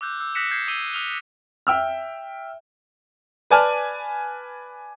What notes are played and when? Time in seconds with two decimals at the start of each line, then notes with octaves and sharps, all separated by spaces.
0.01 D6 E6 F#6 G6
0.20 E6
0.35 D#6 F#6 A#6 B6 C#7 E7
0.51 G6 G#6 C7
0.68 D#6 E6 D#7 G7
0.93 D#6 F6 F7 G7
1.67 E5 G5 E6 F6
3.51 B4 D5 G#5 A5 F6